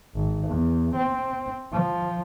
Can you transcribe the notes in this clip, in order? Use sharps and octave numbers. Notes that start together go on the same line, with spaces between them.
G#1
E2
C4
F3